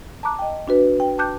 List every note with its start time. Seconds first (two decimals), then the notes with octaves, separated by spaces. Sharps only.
0.23 A5 A#5 D6 F#6
0.39 D#5 G5
0.68 D4 F#4 B4
1.00 G5
1.18 G5 A5 D6 F#6 G6